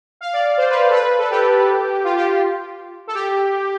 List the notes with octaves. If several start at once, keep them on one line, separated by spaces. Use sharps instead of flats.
F5
D5
C5
B4
A4
B4
A4
G4
F4
G4
A4
G4